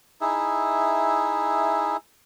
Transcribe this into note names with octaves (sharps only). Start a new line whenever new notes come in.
D#4 E4 G#4 E5